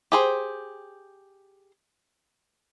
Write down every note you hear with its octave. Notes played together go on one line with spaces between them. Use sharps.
G4 G#4 C5